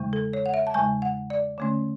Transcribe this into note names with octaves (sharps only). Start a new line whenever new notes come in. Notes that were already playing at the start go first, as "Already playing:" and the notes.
Already playing: E2 C#3 G#3
A4
C#5
F#5
E5
A5
E2 C#3 G#3 G#5
F#5
D5
D3 A3 C#4